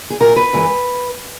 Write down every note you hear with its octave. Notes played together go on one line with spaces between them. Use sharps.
G#4
A#2 F#3 A#4
B4
F#2 E3 G#3